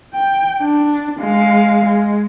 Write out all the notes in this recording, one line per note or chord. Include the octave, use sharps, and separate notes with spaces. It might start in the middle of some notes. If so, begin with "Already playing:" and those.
G5
D4
G#3 F5
G#3